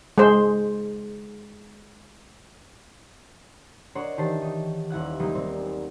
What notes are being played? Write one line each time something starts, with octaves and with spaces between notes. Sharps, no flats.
G#3 C5
D4 A#4 C#5 D#5 F#5 C6
D#3 E3 G4 C5 A5 C7
D#4
D#1 E4 F#5 F#6
F#3 G3 A#3 D#4
A#2 C4